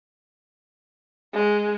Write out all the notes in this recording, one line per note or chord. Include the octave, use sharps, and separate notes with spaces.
G#3